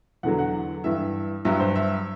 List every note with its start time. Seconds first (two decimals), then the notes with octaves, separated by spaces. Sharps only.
0.23 E2 D3 F#3 F#5
0.39 F#5
0.84 G2 E3 E5
1.45 G2 F#3 E5
1.60 C5
1.75 E5